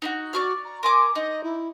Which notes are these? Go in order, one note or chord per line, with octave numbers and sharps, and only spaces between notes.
D#4 E4 F#4
F#4 D5 C#6 F6
A#5
A#4 G#5 C6 D6
D#4 D#5
E4